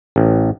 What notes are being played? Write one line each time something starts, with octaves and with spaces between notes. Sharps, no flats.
A1